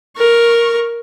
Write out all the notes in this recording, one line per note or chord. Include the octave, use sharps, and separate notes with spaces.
A#4 C#6